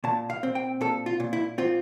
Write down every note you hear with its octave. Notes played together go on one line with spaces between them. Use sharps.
A#2 A5
F5
C4
G5
A#2 A4
F4
A#2
E4
C4 F4